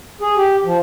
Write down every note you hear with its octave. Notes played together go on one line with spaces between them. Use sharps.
G#4
G4
F3